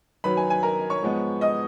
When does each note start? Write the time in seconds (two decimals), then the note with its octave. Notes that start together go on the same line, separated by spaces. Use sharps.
0.24 F#2 D#3 F#3 B4 B5
0.37 G#5
0.50 G#5
0.63 A#4 A#5
0.90 C#5 C#6
1.03 G#2 F3 G#3 B3
1.41 D#5 D#6